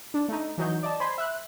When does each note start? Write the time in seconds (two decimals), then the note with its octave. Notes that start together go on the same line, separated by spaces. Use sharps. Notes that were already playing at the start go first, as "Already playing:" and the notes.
0.14 D4
0.29 A3 D#4
0.58 E3 F#3 D#4 G6
0.83 D5 D#5 A5
1.00 C5 G#5 B5 C6
1.18 E5 F#6